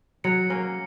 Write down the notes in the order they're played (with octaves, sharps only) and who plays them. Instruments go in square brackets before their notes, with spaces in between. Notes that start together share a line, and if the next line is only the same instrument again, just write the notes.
[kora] F#3 [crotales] C#7
[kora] A#3 C#4